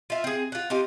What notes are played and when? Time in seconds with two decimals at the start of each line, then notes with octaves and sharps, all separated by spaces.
0.10 F4 E5
0.24 C4 G#4
0.52 F4 F#5
0.70 C4 D#4 F4 G4